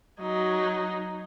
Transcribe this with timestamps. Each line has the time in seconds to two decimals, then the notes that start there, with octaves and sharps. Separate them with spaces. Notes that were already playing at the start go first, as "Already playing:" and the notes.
0.21 F#3 D#4